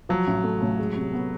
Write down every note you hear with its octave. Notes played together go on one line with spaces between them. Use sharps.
F3 F#3
A1
A3
A2
G#3
C3
B3